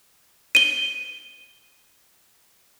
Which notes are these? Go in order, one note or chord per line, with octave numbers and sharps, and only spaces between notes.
D#7 G7